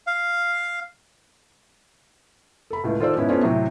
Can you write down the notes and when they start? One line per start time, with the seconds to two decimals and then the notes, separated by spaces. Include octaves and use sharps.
0.07 F5
2.70 A4 B5
2.84 C#2 A2
3.00 D#3 F4 A4 C5 D5 E6
3.15 G#2 B2 B3 C#4 E4
3.29 A3 B3 C#4 F4 C5 D5
3.43 A2 C3 F#3